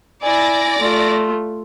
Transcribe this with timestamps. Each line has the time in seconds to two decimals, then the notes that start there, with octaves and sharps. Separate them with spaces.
0.23 E4 D5 G#5 A#6
0.79 A3 F4